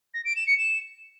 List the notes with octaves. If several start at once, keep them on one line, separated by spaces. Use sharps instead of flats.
A#6
D7
E7
C#7
E7